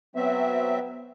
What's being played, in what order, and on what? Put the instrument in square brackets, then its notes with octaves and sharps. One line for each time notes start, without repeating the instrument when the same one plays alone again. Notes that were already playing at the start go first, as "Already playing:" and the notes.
[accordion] F#3 C4 E5 [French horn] B3